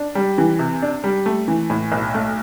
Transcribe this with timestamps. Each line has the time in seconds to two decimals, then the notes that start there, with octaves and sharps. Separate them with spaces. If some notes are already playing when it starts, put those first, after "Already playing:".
Already playing: D4
0.15 G3
0.38 E3
0.59 C3
0.82 D4
1.04 G3
1.26 A3
1.48 E3
1.70 A2
1.92 B1
2.14 A3